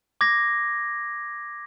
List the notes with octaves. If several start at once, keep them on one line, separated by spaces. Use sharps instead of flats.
D6 G#6 A#6